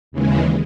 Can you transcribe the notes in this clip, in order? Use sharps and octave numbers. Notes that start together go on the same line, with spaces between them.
D#2 C#3 E3 G#3